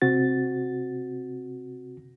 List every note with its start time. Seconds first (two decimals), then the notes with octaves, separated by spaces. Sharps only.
0.02 C3 C4 F#4 A6